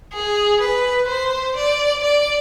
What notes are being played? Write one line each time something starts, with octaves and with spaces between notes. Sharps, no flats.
G#4
B4
C5
D5
D5